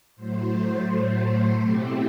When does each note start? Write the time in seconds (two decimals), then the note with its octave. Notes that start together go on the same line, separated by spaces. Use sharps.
0.16 A2 F#3 A3 C5
1.59 B2 A3 C4 E4 G4